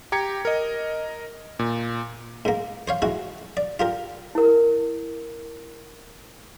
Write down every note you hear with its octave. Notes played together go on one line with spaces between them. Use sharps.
G4 A#5 G#6 C#7
A#4 D#5
A#2
G#2 A#3
C5 C#5 F5
G#3 E4 F#4
D5
F4 G4 A#4
E4 A#4